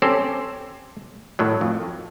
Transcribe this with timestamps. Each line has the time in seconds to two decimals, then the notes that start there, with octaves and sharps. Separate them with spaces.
0.02 C4 C#4 G4 A4 C5
1.39 A2 D#3 F#3
1.61 F2